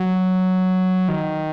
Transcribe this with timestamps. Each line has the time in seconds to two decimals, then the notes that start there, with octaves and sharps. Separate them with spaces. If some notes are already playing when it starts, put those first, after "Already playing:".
Already playing: F#3
1.08 D#3